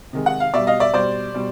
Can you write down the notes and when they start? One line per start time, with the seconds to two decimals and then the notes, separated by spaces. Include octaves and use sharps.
0.13 C3 D#3 G#3
0.26 F#5
0.40 F5
0.54 B2 G3 D5 E5
0.67 D#5 F5
0.80 D5 E5
0.94 B2 G3 C5 D5
1.34 B2 G3